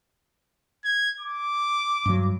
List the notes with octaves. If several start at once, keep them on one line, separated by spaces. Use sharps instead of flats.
G#6
D6
G2 F#3